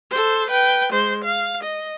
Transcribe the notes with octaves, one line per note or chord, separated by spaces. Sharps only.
A4 C5
B4 G5
G#3 C5
F5
D#5